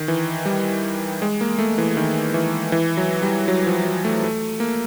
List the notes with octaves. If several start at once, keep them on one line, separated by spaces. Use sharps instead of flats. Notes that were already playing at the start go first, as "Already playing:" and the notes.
Already playing: D#3
E3
G3
G#3
A#3
A3
E3
D#3
E3
E3
F#3
G3
F#3
F3
F#3
A3
A3
A#3